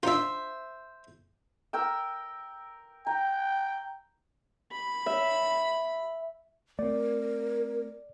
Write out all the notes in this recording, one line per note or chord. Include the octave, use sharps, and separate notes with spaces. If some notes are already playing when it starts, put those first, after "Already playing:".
D4 D#4 F4 C5 E5
A#4 G5 E6
G5 A#5
B5
E5
A3 C4 A#4 D5